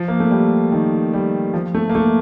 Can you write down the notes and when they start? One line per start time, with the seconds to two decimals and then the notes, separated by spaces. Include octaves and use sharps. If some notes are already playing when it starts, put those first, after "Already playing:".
Already playing: F3
0.08 A#3
0.20 A3
0.31 G3
0.72 D#3
1.13 G3
1.54 F3
1.75 A3
1.89 A#3
1.95 A3